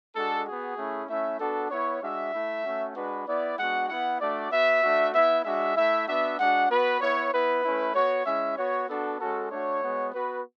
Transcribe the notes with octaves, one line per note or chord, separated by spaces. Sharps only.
G#3 D4 F#4 A4
B3 F#4 G#4
A3 C#4 E4
A3 C#4 E4 E5
B3 D4 F#4 A4
B3 E4 C#5
G#3 D4 F#4 E5
A3 E4
A3 C#4 F#4
G#3 D4 F#4 B4
B3 E4 D5
G#3 B3 D4 F#4 F#5
B3 E4 F#5
A3 D4 F#4 D5
B3 F#4 E5
A3 D4 F#4
B3 E4 E5
G#3 D4 F#4 E5
A3 E4 E5
B3 D4 F#4 E5
G#3 D4 F#4 F#5
B3 F#4 B4
B3 E4 C#5
B3 E4 B4
A3 C#4 E4
B3 F#4 C#5
G#3 C#4 E4 E5
B3 F#4 C#5
B3 D4 F#4 A4
G#3 C#4 F#4 A4
A3 D4 F#4 C#5
G#3 B3 F#4
B3 F#4 B4